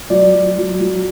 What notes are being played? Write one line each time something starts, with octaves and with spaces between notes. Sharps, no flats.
F#3 D5
F#3
F#3
F#3